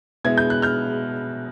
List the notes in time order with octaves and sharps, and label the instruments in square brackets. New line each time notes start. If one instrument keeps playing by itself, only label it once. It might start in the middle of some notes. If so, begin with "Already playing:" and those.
[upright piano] B2 G#3 B3 E4 G#6
G6
F#6
F6 G6